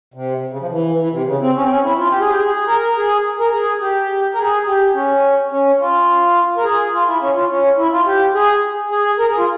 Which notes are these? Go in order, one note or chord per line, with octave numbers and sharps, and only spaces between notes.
C3
C#3
F3
E3
E3
C3
C#3
C4
C#4
C4
C#4
E4
F4
G4
G#4
G4
G#4
G#4
A#4
G#4
A#4
G#4
G4
A#4
G#4
G4
C#4
C#4
F4
A#4
G#4
F4
E4
C#4
F4
C#4
E4
F4
G4
G#4
G#4
A#4
G#4
F4